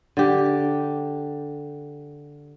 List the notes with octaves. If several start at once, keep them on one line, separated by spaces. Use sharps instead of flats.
D3 G4